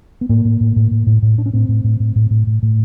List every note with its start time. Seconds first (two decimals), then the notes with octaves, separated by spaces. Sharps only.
0.21 B3
0.29 A2 A#3
0.45 A2
0.60 A2
0.76 A2
0.91 A2
1.07 A2
1.22 A2
1.38 A2 D4
1.46 C#4
1.53 A2 C4
1.69 A2
1.84 A2
2.00 A2
2.16 A2
2.30 A2
2.47 A2
2.62 A2